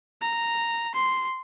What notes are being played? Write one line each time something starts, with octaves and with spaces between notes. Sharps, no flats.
A#5
C6